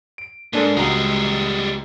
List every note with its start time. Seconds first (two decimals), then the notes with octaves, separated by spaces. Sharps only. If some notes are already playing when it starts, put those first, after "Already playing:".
0.18 D7
0.53 G#2 A#3 D4 A4
0.76 C#2 G3 G#3 F#4 A#5